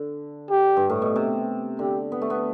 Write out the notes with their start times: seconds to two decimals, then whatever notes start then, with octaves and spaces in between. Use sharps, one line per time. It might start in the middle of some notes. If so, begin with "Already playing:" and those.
Already playing: D3
0.51 G4
0.77 G2
0.89 A2
1.02 B2
1.16 C3
1.79 D3 G4
2.12 B3
2.22 A3
2.30 B3